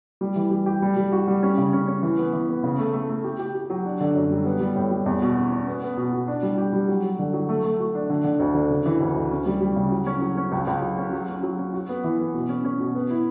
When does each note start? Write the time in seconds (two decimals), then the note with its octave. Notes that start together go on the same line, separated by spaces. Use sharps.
0.21 G3
0.36 E3
0.51 G3
0.66 G4
0.82 G3
0.96 G3
1.12 F#4
1.27 G3
1.43 C#4
1.58 C#3
1.73 C#4
1.87 C#4
2.02 E3
2.18 B3
2.33 E3
2.49 B3
2.64 C#3
2.78 A3
2.93 A3
3.09 A3
3.24 G4
3.39 G4
3.55 G4
3.70 F#3
3.86 D4
4.01 D3
4.15 F#2
4.30 G3
4.45 B3
4.60 G3
4.76 A2
4.91 G3
5.06 E2
5.22 B2
5.37 C#4
5.51 C#4
5.67 B3
5.82 B3
5.97 B2
6.13 B2
6.28 D4
6.43 G3
6.58 G4
6.73 G3
6.88 F#3
7.03 F#3
7.19 D3
7.34 F#3
7.49 A3
7.64 A3
7.79 F#4
7.95 D4
8.10 D3
8.24 D3
8.40 D2
8.55 D3
8.70 C#3
8.86 E3
9.01 D2
9.16 D2
9.31 C#4
9.46 G3
9.61 G3
9.76 C#3
9.92 F#3
10.06 C#4
10.22 F#3
10.37 C#4
10.52 C#2
10.67 C#2
10.82 F#3
10.98 C#4
11.13 F#3
11.28 C#4
11.43 F#3
11.58 C#4
11.74 F#4
11.89 B3
12.04 E3
12.19 B3
12.34 B2
12.49 C#4
12.65 C#4
12.80 B2
12.94 B3
13.10 E4